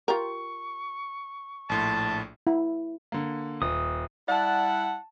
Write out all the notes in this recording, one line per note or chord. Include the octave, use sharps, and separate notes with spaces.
F4 G4 A#4 C#6
A#1 A2 A5 C6
E4
D3 A#3
D#1 D#6
G3 E4 D5 F#5 A5
A5